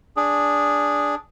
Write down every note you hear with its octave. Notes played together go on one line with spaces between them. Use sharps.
D4 G#4